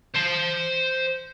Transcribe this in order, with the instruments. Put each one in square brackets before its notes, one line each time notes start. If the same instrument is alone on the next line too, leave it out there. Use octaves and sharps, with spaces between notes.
[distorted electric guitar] C5 A5